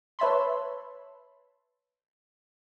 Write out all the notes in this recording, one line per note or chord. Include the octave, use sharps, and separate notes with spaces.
B4 C#5 E5 A5 B5 C6